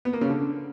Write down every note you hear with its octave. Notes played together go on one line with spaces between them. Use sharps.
B3
A#3
C#3
D3